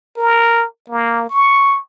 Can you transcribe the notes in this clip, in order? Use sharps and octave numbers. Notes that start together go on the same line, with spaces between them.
A#4
A#3
C#6